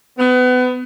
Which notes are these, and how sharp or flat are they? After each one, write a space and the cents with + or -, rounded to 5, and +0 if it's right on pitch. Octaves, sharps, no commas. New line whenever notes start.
B3 +30